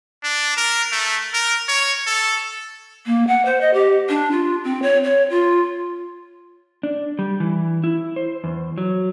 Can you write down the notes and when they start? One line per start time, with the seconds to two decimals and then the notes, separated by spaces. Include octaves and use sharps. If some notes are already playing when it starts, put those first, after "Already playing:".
0.23 D4
0.57 A#4
0.92 A3
1.33 A#4
1.68 C#5
2.07 A4
3.06 A#3
3.27 F#5
3.45 C5
3.61 D#5
3.74 G4
4.09 D4
4.32 F4
4.64 C4
4.82 C#5
5.04 C#5
5.30 F4
6.83 D4
7.19 G3
7.40 E3
7.84 E4
8.16 C5
8.44 E2
8.78 F#3